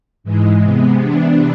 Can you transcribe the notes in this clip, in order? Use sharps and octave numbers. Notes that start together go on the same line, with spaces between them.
G#2 E3 G#3
C3 G#3 B3
C3 E3 B3 D4